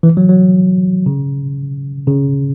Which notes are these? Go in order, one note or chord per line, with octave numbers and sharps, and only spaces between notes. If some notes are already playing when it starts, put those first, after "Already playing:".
E3
F#3
F#3
C#3
C#3